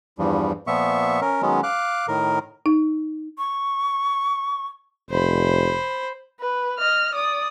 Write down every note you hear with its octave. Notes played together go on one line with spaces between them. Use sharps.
E2 G2 E3 F3 G3
A#2 F3 B3 E5 C#6
C#4 A#4
D#3 F#3 G#3 B3 C#4
F5 D6 F#6
A2 D#3 A#4
D#4
C#6
F1 C5 B5
B4
D#5 F6
D5 D#6